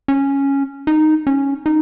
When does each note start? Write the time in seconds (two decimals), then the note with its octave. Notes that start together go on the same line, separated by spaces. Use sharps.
0.08 C#4
0.87 D#4
1.27 C#4
1.66 D#4